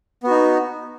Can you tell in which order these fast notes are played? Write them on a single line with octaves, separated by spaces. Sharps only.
B3 F#4 D#4